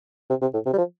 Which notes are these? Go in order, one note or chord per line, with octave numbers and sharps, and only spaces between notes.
C3
C3
A2
C3
G3
F3